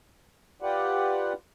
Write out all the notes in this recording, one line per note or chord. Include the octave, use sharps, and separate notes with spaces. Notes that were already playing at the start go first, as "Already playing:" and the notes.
F4 G4 B4 D5 F#5